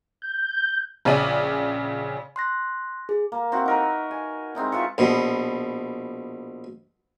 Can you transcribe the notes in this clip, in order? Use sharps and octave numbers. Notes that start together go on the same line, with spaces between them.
G6
A#1 C#3 C#4 D5 D#7 F#7
C6 F#6 A#6
G#4
A#3
C4 E4 F#4
D#4 A#4 B4
G#5
G#3 C4 D#4 E4
F4 B4 E5 C#6
A#1 B2